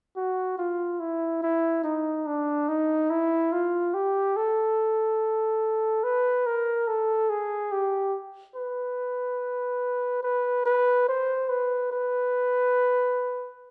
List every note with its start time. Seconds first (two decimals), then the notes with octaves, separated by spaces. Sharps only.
0.16 F#4
0.58 F4
1.00 E4
1.43 E4
1.84 D#4
2.26 D4
2.68 D#4
3.10 E4
3.52 F4
3.94 G4
4.36 A4
6.04 B4
6.46 A#4
6.88 A4
7.29 G#4
7.72 G4
8.56 B4
10.23 B4
10.65 B4
11.08 C5
11.49 B4
11.92 B4